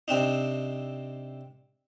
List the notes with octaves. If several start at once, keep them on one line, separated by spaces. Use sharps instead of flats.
C3 C4 D4 D#4